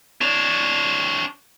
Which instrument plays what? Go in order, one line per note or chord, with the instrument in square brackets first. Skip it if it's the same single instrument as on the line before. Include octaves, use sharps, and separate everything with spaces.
[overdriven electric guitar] D4 C#5